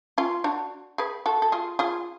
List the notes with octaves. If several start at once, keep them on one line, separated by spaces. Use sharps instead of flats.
C#4 F4
D4 F#4
G#4 B4
F#4 A4
A4
F4 G#4
F4 G#4